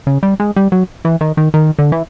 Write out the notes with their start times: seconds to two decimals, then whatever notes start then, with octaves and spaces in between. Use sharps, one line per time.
0.07 C#3
0.23 G3
0.40 G#3
0.56 G3
0.72 F#3
1.05 E3
1.21 D#3
1.37 D#3
1.54 D#3
1.79 D3
1.92 E3